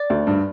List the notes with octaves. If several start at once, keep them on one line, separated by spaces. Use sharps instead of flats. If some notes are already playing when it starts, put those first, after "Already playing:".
Already playing: D5
D2
G2